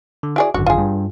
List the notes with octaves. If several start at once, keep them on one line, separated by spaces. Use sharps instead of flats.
D3
E4 F#4 G#4 D5
G#1 F#2 D3 F#4
F4 G#4
G2